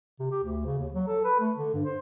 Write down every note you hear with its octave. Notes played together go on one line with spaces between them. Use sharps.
C3
G4
D2
C#3
D#2
F#3
A4
B4
A3
D3
G2
C5